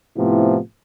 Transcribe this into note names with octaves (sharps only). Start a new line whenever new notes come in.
A2 C3 F3 B3 E4